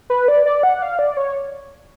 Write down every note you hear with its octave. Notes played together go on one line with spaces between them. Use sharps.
B4
D5
D5
F#5
F5
D5
C#5